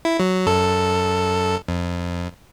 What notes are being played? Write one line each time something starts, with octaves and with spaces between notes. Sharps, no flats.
E4
F#3
F#2 A4
F2